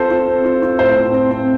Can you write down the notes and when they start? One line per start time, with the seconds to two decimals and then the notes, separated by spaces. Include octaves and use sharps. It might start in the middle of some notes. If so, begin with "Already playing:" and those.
Already playing: C4 F4 A4 C5
0.11 F4
0.28 C4
0.44 F4
0.62 F4
0.79 A2 C5
0.97 C4
1.14 C4
1.31 C4